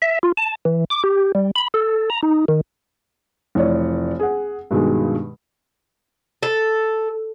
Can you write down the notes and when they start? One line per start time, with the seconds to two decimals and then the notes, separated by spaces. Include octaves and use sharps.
0.02 E5
0.23 F4
0.37 A5
0.65 E3
0.90 D6
1.04 G4
1.35 G3
1.56 B5
1.74 A4
2.10 A#5
2.23 D#4
2.48 D#3
3.55 F1 E3 C#5 D5
4.20 G#4 F#5
4.71 G2 B2 D#3 G#3
6.43 A4